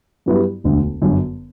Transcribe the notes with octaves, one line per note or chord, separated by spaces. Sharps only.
G2 F#3 B3 E4 G4
E1 D2 D3
G1 F#2 D3 F#3